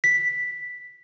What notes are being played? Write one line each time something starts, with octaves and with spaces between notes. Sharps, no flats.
B6